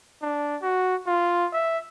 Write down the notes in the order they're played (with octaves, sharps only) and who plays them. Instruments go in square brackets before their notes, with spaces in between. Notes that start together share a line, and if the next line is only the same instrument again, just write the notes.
[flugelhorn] D4
F#4
F4
E5